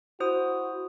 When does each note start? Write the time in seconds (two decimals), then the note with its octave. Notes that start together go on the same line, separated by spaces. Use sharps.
0.20 E4 F#4 C5 D#6